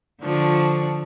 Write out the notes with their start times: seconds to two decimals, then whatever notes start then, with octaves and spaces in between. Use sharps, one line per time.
0.21 D3 F3 D4 C#6